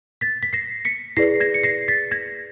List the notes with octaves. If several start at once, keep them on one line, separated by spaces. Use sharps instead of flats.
A6 B6
B6
A#6 C7
B6 C#7
E4 G#4 B4 D5 A#6 C7
G#6 A#6
C#7
A#6 C7
A6 B6
G#6 A#6